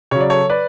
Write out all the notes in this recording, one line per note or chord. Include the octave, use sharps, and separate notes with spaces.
C#3 F#3 C#5
D5
A4 C#5
B4 D5